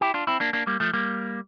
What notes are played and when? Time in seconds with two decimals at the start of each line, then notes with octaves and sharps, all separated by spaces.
0.01 E4 G4
0.14 D4 F4
0.27 C4 E4
0.40 A#3 D4
0.53 A#3 D4
0.67 G3 A#3
0.80 F3 A3
0.93 G3 A#3